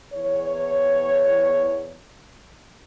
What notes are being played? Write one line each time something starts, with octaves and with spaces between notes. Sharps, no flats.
E2 C#5